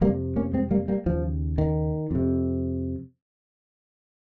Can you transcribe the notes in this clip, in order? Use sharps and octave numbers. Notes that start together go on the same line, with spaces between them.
F2 C3 G3 A#3
A#3 C#4
G#3 C4
G3 A#3
G3 A#3
D#2 C#3 F3
D#3
F2 C3